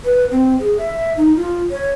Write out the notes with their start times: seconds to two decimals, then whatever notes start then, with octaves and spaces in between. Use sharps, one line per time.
0.05 B4
0.31 C4
0.60 G#4
0.78 E5
1.17 D#4
1.36 F4
1.71 C#5